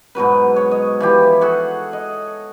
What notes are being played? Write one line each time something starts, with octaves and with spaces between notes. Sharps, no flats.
G#2 B2 F#3 B4
C#5
D#5
E3 F3 G4
F#4 G#4 A4 F#5
D#5